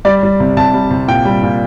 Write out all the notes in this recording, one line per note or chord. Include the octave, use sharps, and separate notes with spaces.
G3 D5
G3
C3
C3 A5
G3
C3
A#2 G5
G3
A#2